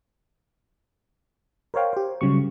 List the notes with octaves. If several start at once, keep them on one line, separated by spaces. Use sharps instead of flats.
A#4 C5 C#5 F5 G5
G4 C5
C#3 F#3 G3 C#6